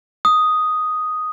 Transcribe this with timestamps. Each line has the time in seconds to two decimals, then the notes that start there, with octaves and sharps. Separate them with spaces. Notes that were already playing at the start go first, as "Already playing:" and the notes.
0.25 D#6